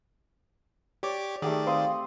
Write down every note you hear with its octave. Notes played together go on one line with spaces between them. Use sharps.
G4 C#5 D5 D6
D#3 A3 G4 G#4 D5
C4 F5 C6 D#6